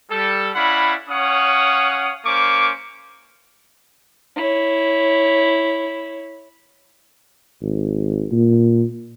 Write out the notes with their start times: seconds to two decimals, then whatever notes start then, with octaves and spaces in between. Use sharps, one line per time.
0.11 G3 A4
0.55 C#4 E4 D5 F5 F#5 B5
1.10 C#4 C#5 F5 F#5 D#6
2.25 A#3 C#4 C5 C#6 D6
4.36 E4 C#5
7.62 G#1
8.32 A#2